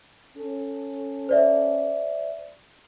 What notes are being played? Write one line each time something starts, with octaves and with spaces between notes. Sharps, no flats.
C#4 A4
C5 D5 E5